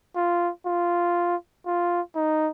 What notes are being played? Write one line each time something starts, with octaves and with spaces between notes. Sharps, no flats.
F4
F4
F4
D#4